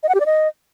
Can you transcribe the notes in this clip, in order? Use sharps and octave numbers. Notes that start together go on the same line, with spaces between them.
D#5
F#5
G4
D5
D#5